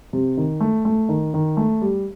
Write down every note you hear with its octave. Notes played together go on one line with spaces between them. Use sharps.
C3
D#3
A3
A3
D#3
D#3
A3
G3